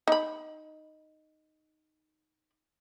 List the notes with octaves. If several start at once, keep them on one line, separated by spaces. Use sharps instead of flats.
D#4 B5